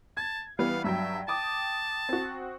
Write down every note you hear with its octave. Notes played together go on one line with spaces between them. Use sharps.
A5 G#6
E3 G3 B3 F5
G2 F#3 E5 G5
G5 A5 D6 D#6
C4 F#4